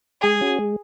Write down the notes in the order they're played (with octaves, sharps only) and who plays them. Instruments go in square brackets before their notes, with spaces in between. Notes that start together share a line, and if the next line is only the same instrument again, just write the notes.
[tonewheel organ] G#3 [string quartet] G#4
[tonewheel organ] C#4 F#4
G#3